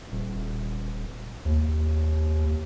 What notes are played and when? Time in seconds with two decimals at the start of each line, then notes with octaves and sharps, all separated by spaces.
0.12 D#1
1.45 D#2